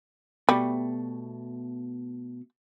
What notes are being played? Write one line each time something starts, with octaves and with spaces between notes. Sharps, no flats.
B2 G3 A3